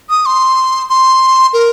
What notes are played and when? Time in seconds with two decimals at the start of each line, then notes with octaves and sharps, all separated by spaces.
0.10 D#6
0.26 C6
0.89 C6
1.54 A#4